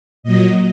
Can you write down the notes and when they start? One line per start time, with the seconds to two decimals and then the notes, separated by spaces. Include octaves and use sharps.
0.23 A#2 F#3 D#5